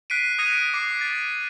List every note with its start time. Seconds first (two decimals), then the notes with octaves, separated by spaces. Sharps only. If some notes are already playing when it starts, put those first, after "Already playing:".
0.10 F#6 B6 C7 D7 D#7
0.39 D#6 F#6 G#6 A#6 C#7 D#7
0.74 D6 C7
1.01 A6